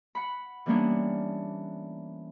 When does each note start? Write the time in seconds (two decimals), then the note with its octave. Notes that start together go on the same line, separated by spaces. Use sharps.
0.15 F#5 B5
0.66 E3 G3 A#3 B3 C#4 D4